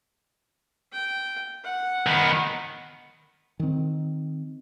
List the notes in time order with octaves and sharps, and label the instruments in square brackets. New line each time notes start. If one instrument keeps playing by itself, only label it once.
[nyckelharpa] G5
F#5
[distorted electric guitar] D#3 B3
[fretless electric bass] D#3 C4